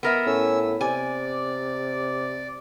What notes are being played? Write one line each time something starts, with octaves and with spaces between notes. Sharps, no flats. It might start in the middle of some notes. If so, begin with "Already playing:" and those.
B3 A#4 E5
A2 C#4 E6
C3 D5 G#5